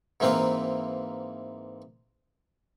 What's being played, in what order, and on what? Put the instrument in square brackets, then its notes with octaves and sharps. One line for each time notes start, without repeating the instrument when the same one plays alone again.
[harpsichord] G#2 E3 A#3 C4 B4 F5